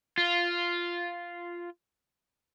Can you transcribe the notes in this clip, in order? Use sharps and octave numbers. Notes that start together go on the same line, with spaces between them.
F4